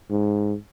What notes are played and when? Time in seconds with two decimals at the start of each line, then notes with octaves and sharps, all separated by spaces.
0.11 G#2